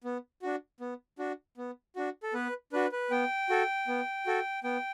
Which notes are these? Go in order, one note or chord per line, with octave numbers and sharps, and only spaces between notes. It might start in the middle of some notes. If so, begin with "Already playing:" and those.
B3
D4 F#4
B3
D4 F#4
B3
D4 F#4
A4
B3 B4
D4 F#4 B4
B4
B3 G5
F#4 A4
B3
F#4 A4
B3 G5